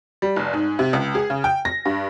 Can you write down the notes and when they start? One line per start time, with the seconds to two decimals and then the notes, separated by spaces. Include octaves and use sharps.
0.22 G3
0.36 F1
0.53 G#2
0.79 C3
0.93 C#2
1.15 G#4
1.30 C#3
1.44 G5
1.65 A#6
1.85 G2